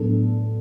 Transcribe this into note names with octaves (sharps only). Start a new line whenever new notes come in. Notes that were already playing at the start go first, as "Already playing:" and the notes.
Already playing: A2 F#3 B3 D4 A4